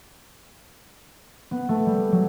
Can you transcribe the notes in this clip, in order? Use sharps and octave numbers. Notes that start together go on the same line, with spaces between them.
B3
A3
G3
F#3